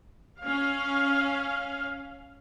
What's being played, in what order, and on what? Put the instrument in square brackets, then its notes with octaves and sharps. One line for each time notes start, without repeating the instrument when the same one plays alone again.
[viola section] C#4 F5